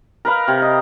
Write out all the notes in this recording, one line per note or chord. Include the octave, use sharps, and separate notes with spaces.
A#4 B4 F5
C3
D#5